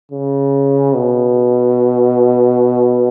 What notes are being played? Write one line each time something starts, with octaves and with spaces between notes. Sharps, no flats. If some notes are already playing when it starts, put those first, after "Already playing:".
C#3
B2